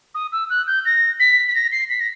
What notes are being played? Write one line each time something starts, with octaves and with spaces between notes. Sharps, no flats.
D#6
E6
F#6
G6
A#6
B6
B6
A#6
C7
B6
A#6